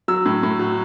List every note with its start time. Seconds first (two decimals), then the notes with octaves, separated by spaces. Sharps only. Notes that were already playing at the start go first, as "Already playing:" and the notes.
0.08 F#3 E6
0.25 A2
0.43 A2
0.59 F#3